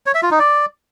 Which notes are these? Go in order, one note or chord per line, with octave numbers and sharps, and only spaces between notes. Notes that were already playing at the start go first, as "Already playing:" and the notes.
C#5
E5
F4
D#4
D5